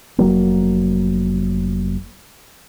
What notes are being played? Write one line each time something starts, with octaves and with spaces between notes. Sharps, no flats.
F1 F#3 A#3